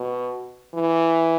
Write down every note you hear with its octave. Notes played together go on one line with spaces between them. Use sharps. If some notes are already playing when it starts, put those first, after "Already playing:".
Already playing: B2
E3